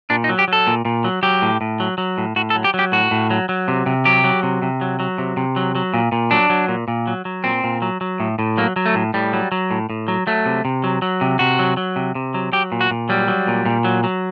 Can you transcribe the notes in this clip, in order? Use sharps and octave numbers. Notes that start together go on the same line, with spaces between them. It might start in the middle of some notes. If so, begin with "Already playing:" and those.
A#2 D4
D#4
F#3
G4
F#3 A4
A#2
A#2
F#3
F#3 G4
A2
A2
F#3
F#3
A2
A2 F#4
A4
F#3
G4
F#3
G4
A2 F#4
A2
F#3
F#3
C3
C3
F#3 G4
F#3
C3
C3
F#3
F#3
C3
C3
F#3
F#3
A#2
A#2
F#3 D4
F#3
A#2
A#2
F#3
F#3
A#2 C4
A#2
F#3
F#3
A2
A2
F#3 A#3
F#3
A3
A2
A2 G3
F#3
F#3
A2
A2
F#3
F#3 A3
C3
C3
F#3
F#3
C3
C3 F#4
F#3
F#3
C3
C3
F#3
F#3 G4
A#2
F#4
A#2
F#3 G3
F#3
A#2
A#2
F#3
F#3